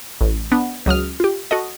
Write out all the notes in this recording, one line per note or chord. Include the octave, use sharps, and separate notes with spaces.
A1
B3 D4
C#2 F#3 D#6 F6
F4 G4
F#4 A4 D#5